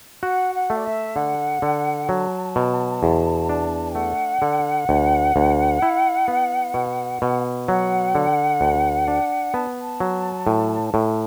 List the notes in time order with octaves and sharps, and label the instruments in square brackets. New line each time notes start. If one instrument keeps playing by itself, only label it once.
[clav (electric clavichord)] F#4 [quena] F#5
[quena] F#5
[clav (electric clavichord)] A3
[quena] D5
E5
[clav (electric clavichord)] D3 [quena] F#5
[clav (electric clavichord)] D3
[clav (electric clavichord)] F#3 [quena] A5
[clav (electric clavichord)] B2
E2
D4
[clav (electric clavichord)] A3 [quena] F#5
[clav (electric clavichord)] D3
D2
D2
E4
B3
B2
B2
[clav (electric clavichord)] F#3 [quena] F#5
[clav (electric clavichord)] D3
D2
D4
[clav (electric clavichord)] B3 [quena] A5
[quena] A5
[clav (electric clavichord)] F#3
A2
A2